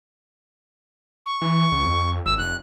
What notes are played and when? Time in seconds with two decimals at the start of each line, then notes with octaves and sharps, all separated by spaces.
1.26 C#6
1.42 E3
1.72 C#2
1.85 F2
2.26 G#1 E6
2.38 F1 F#6